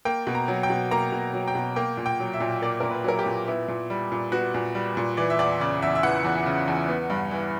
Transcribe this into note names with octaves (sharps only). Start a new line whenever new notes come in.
A#3 G5
B2
A#5
F#3
G5
B2
A#3 A#5
B2
F#3
G5
B2
A#3 G5
A#2
G5
F#3
E5
A#2
A#3 D5
A#2 A#4
B4
F#3 A#4
G4
A#2
B3 E4
A#2
G3
A#2
B3 F#4
A#2
G3
A#2
E3 D5
E5
E2 D5
C#3 D5
E2 E5
E5
E3 F#5
E2
C#3
E2
B3
G2
E3